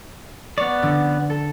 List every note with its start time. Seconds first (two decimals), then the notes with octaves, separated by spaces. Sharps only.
0.58 B3 C#5 D5
0.83 D3
1.30 A4